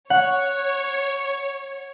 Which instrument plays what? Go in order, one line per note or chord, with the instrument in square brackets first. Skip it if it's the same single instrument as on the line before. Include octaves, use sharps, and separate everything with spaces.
[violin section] C#5 [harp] F#5